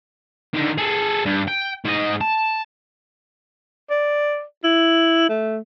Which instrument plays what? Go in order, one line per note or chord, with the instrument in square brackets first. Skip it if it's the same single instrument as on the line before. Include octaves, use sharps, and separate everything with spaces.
[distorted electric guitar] D3 D#3
G#4 A4
G2
G5
G#2 D#5
A5
[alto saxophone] D5
E4
A3